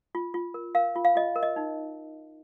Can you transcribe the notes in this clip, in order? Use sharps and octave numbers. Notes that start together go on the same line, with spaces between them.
F4
F4
A#4
A#4 F5
F4
F5
F4 D#5
A#4
D#5
D#4